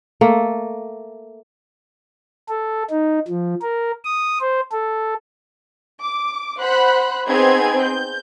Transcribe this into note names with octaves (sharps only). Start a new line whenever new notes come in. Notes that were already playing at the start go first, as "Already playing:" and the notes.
A3 A#3
A4
D#4
F3
A#4
D#6
C5
A4
D6
C5 F#5 B5 F#6
B3 C4 D#4 G#4 G#5 G#6
G6